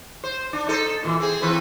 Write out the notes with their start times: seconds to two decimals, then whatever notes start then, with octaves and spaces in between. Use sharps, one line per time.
0.24 C5
0.53 D4
0.67 D#4 A4 C5
1.03 A#2 D#3 E3
1.20 C4 G#4
1.42 E3 C4 B4